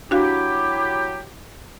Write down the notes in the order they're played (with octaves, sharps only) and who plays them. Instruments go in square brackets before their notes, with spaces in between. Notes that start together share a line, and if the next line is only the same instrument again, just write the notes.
[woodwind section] F#3 E4 G4 [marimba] D4 F#4 F5